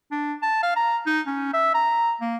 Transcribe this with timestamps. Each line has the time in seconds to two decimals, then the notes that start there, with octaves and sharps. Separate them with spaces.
0.11 D4
0.42 A5
0.63 F5
0.76 A#5
1.06 D#4
1.27 C#4
1.53 E5
1.74 A#5
2.21 A#3